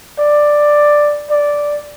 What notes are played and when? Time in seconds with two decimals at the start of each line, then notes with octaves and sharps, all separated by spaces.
0.19 D5
1.30 D5